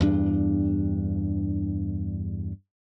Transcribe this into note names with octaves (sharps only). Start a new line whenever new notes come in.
E2 G2 D4